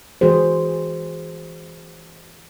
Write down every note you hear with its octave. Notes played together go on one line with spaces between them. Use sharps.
E3 G#3 F#4 G#4 C5